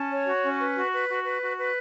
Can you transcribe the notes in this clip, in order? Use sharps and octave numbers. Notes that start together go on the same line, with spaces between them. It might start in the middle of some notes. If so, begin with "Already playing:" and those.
Already playing: C#4 A5
C#5
F#4
C#4
B4
F#4
B4
F#4
B4
F#4
B4